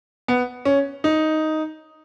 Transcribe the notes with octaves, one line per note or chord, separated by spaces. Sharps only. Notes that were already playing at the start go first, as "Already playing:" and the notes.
B3
C#4
D#4